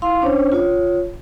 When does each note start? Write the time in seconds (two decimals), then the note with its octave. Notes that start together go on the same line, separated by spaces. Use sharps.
0.02 E4 F5 C6
0.22 C#4 D4 C5 C#5
0.52 F4 C#5